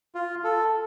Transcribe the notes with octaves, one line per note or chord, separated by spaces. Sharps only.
F4
A4